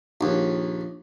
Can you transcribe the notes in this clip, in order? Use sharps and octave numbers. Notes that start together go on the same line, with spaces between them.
A#1 D#2